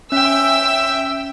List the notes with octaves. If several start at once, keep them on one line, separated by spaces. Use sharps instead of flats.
C#4 E5 G5 E6